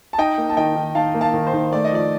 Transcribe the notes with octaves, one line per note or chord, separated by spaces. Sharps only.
A5
D#4 D#5 G5
A#3
A5
D#3 D#5 G5
D#3
D#4 F5 A5
A#3
F5 A5
D#3
C5
D#3
A3 D5
D#5
F3 D5